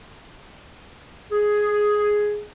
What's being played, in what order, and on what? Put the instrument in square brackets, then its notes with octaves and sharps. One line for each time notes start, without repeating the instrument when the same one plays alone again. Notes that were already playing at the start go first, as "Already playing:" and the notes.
[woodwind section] G#4